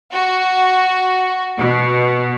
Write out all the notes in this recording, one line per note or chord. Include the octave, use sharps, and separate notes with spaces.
F#4
B2